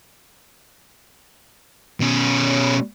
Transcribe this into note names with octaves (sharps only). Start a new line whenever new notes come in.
B2 C#4